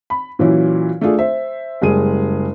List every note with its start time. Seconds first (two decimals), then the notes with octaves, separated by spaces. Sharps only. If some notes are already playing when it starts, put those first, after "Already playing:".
0.10 B5
0.39 A#2 E3 F#3 C#4 E4
1.01 A3 D4 F4 G#4
1.19 C5 E5
1.82 F#1 G3 G#3 G#4 D#7